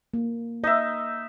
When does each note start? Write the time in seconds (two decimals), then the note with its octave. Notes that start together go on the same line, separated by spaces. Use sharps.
0.14 A#3
0.64 D#4 D#5 E5